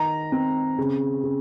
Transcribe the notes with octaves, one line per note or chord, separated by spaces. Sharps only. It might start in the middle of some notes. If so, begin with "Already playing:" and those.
Already playing: D#3 A#5
C4
C#3
C#3